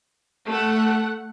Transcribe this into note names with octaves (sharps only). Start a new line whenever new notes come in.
A3 F#5